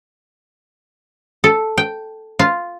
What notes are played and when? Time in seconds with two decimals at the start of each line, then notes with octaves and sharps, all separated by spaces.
1.44 A4
1.78 G5
2.39 F4